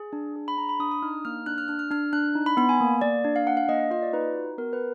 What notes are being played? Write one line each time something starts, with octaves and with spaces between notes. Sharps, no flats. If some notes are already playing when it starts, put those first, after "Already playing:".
Already playing: G#4
D4
G#4
B5
D4 A#5
B5
D4 D#6
D#6
D#4 F6
A#3 F6
D4 F#6
F6
D4 F6
F6
D4 F6
D4 F#6
D#4
B5
B3 B5
G#5
A#3
A#3 D5
D4
F5
D4 F#5
F5
A#3 D#5
F5
F4 D#5
D5
D#4 B4
F#4
B3 A#4
B4